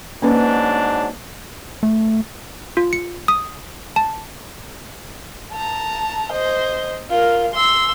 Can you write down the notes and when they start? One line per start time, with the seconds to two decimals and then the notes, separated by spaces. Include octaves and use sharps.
0.22 G#2 F#3 A#3 C#4 D4 B4
1.83 A3
2.77 F4
2.93 C#7
3.28 D#6
3.96 A5
5.52 A5 A#5
6.32 C5 D#5
7.10 F4 A#4
7.54 C6 E6